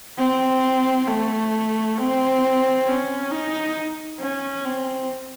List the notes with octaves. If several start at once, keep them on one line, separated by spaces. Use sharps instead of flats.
C4
A3
C4
C#4
D#4
C#4
C4